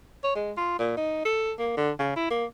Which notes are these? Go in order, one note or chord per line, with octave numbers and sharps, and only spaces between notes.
C#5
G#3
F4
A#2
D#4
A4
A#3
D3
C#3
E4
A#3